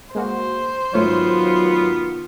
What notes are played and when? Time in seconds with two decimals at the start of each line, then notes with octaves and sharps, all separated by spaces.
0.15 G#3 A#3 F#4 C5
0.93 G#2 D#3 F#3 A3 B3 F4 C#5